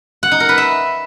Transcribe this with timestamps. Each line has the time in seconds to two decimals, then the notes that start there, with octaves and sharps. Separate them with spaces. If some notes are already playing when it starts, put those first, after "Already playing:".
0.23 F#5
0.31 D#4
0.40 A#4
0.49 B4
0.58 E5